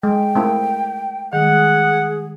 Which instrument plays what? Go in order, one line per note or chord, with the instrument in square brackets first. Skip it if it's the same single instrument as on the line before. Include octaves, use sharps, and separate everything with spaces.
[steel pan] G#3 [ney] G5
[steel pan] A3 C4 E4 [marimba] A#4 F5 D#6
[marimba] D#3 G3 G#3 [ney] G#4 [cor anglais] F#5